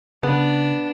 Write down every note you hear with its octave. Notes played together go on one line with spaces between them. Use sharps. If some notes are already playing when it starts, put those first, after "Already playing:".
C#3 B3 D4